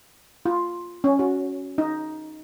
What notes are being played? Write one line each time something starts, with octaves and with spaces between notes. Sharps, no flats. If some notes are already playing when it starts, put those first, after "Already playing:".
F4
C#4
F#4
D#4